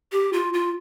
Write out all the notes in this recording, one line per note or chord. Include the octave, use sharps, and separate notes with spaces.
G4
F4
F4